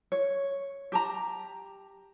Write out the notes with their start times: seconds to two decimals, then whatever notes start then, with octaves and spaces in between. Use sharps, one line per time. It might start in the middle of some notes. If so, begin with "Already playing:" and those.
0.12 C#5
0.92 G4 A5 A#5